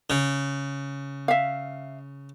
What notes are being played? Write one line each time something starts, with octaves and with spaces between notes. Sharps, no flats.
C#3
E5 F5